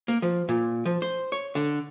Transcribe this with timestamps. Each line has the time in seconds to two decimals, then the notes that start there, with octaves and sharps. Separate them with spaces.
0.08 A#3
0.22 F3
0.49 A#2
0.85 F3
1.02 C5
1.32 C#5
1.55 D3